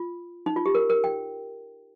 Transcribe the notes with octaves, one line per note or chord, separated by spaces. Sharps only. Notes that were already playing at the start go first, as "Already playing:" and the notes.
Already playing: F4
D#4
F4
G4
A#4
A#4
G5